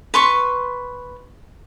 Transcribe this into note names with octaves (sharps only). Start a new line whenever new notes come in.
B4 C6 C#6